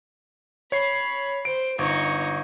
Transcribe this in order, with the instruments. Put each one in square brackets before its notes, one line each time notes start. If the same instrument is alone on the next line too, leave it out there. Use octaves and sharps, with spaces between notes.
[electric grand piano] C#5 C7 [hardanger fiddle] B5
[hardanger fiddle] C5 [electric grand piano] D7
[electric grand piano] G1 [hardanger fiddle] D#4 C#6